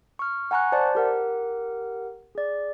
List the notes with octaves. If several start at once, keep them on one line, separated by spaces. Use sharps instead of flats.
C#6 F6
F#5 G#5 A#5 C#6 F#6
C5 D5 A5
G4 A#4 F#5
G#4 D5